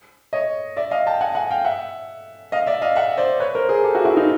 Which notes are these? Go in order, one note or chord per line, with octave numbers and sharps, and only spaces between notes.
C#5 D#5
D5 E5
D#5 F5
G5 A5
F#5 G#5
F#5 G#5
F5 G5
E5 F#5
D#5 F5
D5 E5
D#5 F5
E5 F#5
C5 D5
B4 C#5
A#4 C5
G#4 A#4
G4 A4
F#4 G#4
E4 F#4
D#4 F4